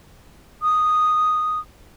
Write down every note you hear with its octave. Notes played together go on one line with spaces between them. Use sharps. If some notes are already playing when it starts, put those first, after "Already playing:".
D#6